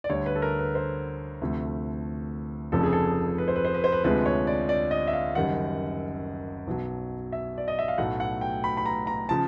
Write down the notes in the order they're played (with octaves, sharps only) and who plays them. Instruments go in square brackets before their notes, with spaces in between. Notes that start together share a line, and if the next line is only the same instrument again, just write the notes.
[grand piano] D5
D2 D3 G3 C#5
B4
A4
A#4
B4
C5
D2 C3 F3 A3
F1 F2 C#3 F3 A4
G#4
A4
B4
C5
B4
C5
B4
C5
B4
D2 C3 F3 G#3 B4
C#5
D5
D5
D#5
E5
F5
F#1 F#2 D#3 G3 F#5
B1 B2 F#3
E5
D5
D#5
E5
F5
B1 A2 F#3 A3 F#5
F#5
G5
B5
B5
A#5
A#5
C#3 F3 A5